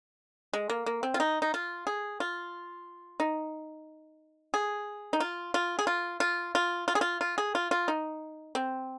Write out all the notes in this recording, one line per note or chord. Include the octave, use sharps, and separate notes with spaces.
G#3
A#3
A#3
C4
F4
D#4
D#4
F4
G#4
F4
D#4
G#4
D#4
F4
F4
G#4
F4
F4
F4
F4
G#4
F4
F4
G#4
F4
F4
D#4
C4